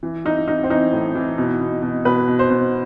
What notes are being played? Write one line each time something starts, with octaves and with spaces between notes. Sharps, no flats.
E3
E3 D#4
E3 D#4
C4
E3 D#4
A2
E3
B2
B2
B2
B2 B4
B2
C5
B2